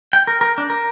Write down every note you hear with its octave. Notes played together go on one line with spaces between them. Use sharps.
G5
A#4
A#4
D4
A#4